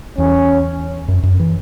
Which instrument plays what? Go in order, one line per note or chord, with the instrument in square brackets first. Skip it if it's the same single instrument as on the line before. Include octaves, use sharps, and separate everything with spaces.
[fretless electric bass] E2 [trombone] C#4
[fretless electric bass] F#2
F#2
E3